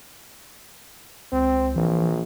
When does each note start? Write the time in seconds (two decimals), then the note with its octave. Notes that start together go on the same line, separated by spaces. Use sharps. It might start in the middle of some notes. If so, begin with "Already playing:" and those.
1.32 C#2 C4
1.76 A#1 E3